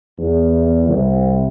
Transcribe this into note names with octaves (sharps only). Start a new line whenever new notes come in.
E2
C2